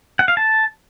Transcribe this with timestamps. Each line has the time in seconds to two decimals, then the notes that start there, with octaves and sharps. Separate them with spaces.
0.19 F#5
0.28 F5
0.37 A5